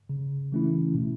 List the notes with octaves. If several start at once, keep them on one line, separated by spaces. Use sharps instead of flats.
C#3
E3 A3 C#4 E4
B2